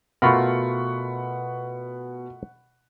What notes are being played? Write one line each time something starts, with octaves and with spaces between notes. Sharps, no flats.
B2 A3 F4 A#4 F#5 B5 C#6